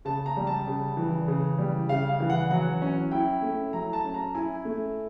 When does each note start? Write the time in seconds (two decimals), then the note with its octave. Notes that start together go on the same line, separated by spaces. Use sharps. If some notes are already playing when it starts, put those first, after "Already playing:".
0.05 C#3 A5
0.26 A#5
0.37 G3
0.47 A5
0.67 C#3
0.97 E3
1.28 C#3
1.59 G3
1.89 C#3 F5
2.09 F5
2.20 E3
2.30 F#5
2.51 F#3 F#5
2.82 C#4
3.11 E4 G5
3.42 A3
3.73 F#3 A#5
3.93 A5
4.04 C#4
4.14 A#5
4.35 E4 G#5
4.65 A3